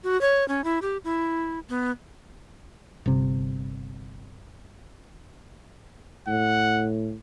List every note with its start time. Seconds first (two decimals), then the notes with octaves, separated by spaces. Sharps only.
0.04 F#4
0.21 C#5
0.48 C#4
0.64 E4
0.82 G4
1.04 E4
1.69 B3
3.06 G1 C3
6.28 A2 F#5